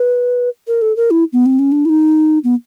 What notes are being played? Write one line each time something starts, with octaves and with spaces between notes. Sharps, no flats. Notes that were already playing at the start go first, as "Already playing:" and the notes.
Already playing: B4
A#4
A4
A#4
E4
B3
C4
C#4
D4
E4
D#4
B3